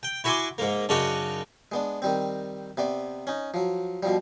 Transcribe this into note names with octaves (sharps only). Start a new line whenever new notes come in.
G5
E4 F#4 E5 G#5 C6 D6
G#2 A#3
F#2 C#3 D4 D#4 F#4
G#3 B3 D4
D#3 G3 C4
C3 B3 D5
C#4 D#4
F3 F#3
B2 F3 G3